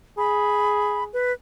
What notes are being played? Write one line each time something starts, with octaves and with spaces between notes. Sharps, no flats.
G#4 B5
B4